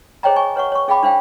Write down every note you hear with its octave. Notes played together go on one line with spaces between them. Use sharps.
G#4 C5 C#5 D#5 G5 A#5
G#5 C#6
B4 C#5 F#5 C#6
C#5 C#6
C#4 G#4 F5 G5 B5 D6
D4 C5 F5 G5